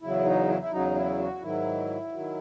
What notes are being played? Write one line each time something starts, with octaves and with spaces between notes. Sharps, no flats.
E2 C#3 F#3 E4
D#4
E4
E4
E2 C#3 F#3 D#4
E4
F#4
G#2 D#3 F#3 E4
D#3 F#3